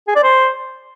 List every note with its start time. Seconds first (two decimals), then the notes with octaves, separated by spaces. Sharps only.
0.08 G#4
0.15 D5
0.23 C5